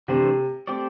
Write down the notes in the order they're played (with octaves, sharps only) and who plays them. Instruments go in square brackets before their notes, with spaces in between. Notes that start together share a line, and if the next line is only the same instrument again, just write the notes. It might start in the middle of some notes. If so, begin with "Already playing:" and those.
[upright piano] C3 [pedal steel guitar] E3 A3 D4 C5
[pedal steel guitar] A3 C4 G4 D5